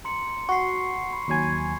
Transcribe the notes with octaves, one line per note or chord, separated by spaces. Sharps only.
A#5 C6 C#7
F#4 C#6 C7
B5 C6
D#2 F#3 G#5 C#6 G#6